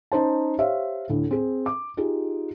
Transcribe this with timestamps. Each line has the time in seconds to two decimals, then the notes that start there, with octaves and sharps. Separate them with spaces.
0.12 C#4 D#4 C5 A5
0.59 G4 C5 C#5 E5 F5
1.10 D2 A2
1.31 C4 G#4
1.66 D6
1.97 D#4 F4 G4 G#4